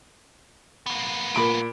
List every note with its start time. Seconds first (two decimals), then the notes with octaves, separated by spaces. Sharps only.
0.86 A#3 B3
1.35 A#2 B5 D7